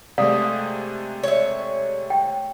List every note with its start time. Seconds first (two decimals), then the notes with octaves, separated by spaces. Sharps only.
0.18 C3 G#3 A3 D5 F5 D#6
1.23 C#5 E5
2.10 G5